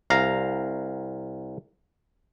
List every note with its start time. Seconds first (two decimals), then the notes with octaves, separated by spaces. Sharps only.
0.10 C2 F5 A#5